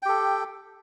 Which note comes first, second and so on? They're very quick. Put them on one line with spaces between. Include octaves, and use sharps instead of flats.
G5 G4 A4